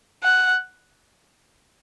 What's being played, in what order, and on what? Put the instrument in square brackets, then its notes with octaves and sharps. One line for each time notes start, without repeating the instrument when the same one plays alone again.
[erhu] F#5